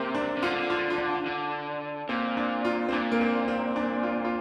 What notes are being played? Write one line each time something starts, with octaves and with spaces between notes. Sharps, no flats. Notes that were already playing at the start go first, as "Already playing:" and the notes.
Already playing: C3 A#3 C4
D4
C3
D3 F4
F4
F4
D4
D3
A#2 C4
D4
F4
C4
A#2 D4
A#3
C4
C4
D4
F4
F4